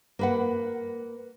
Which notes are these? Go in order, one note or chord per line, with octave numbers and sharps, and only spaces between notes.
A#3 B4 F#5